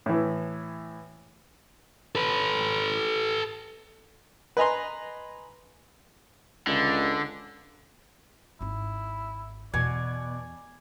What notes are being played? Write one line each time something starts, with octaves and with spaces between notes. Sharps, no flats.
A2 E3
A4 B4
B4 D#5 G#5 A#5 C6
C#2 D3
G#1 D#4 E4
E2 B2 D5 G#5